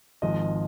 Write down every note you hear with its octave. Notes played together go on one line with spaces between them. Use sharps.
G#1 G#2 F3 D#5